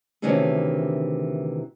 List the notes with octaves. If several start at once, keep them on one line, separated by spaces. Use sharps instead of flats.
D2 C3 D#3 E3 C#4 D4